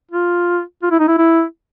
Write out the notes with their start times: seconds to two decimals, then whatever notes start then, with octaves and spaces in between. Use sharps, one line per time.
0.11 F4
0.83 F4
0.91 E4
0.99 D#4
1.08 E4
1.18 E4